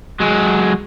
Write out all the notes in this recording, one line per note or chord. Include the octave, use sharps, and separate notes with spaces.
F#3 G#3